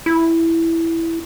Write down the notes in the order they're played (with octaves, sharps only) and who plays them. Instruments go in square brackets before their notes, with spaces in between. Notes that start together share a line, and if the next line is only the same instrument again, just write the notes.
[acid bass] E4